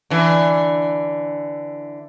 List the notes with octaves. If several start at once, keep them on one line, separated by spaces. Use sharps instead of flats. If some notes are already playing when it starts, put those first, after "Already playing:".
D3 E3